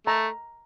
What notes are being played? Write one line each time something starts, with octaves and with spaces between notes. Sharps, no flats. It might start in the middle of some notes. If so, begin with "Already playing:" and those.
A3 A#5